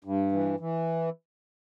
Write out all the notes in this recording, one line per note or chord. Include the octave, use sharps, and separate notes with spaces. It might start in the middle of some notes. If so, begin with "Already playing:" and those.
G2
E3
E3